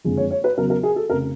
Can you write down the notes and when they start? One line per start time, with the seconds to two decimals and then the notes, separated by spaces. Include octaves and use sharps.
0.04 F#1 F2 D3 F3 G#3
0.17 C#5
0.31 C#5
0.44 B4
0.57 E2 C#3 F#3 A#4
0.70 A#4
0.83 G#4
0.96 A4
1.10 F1 C#3 A#4